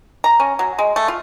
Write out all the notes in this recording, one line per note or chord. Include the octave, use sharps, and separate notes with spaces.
A#5
C#4
F#3
G#3
A3
F4